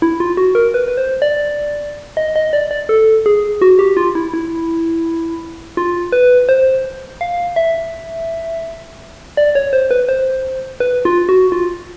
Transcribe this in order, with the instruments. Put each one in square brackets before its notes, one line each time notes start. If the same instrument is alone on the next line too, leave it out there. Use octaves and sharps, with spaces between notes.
[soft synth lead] E4
F4
F#4
A#4
B4
B4
C5
D5
D#5
D#5
D5
D5
A4
G#4
F#4
G4
F4
E4
E4
F4
B4
C5
F5
E5
D5
C#5
C5
B4
C5
B4
F4
F#4
F4